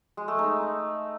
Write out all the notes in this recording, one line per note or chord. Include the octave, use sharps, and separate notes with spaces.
G#3
A3
D#4